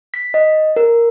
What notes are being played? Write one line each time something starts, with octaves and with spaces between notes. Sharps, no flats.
B6
D#5
A#4